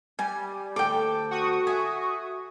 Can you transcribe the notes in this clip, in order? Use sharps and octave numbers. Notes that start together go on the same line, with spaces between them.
G3 G#5
D2 A4 G5 D6
F#4 C#6 D#6
E5 G#5